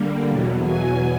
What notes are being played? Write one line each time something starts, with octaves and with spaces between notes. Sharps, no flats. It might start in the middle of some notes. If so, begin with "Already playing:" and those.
Already playing: D3 G3 A#3
E2 B2 F#3
G#5